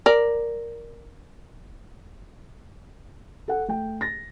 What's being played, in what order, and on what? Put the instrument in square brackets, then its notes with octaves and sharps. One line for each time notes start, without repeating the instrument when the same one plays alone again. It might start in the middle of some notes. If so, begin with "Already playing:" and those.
[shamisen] A#4 D5
[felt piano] A4 F#5
A3 G5
A6 A#6